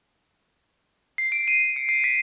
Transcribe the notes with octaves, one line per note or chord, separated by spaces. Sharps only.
C7
D7
D#7
C#7
C7
B6